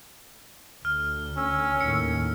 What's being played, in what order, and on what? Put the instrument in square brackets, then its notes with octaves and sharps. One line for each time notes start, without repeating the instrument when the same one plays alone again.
[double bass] D2 [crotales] F6
[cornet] C#4 [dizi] E6
[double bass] D#2 A2 [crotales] C#7